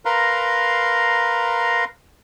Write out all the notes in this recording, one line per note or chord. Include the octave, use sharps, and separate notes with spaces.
A#4 B4 F5 A#5 C6